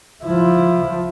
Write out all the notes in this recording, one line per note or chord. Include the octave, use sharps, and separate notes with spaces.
F3 E4